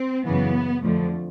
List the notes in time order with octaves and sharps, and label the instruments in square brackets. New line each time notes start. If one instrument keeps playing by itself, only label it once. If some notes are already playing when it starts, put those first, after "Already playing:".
Already playing: [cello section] C4
F#2 C#3 E3 B3
F2 D3 F3 A3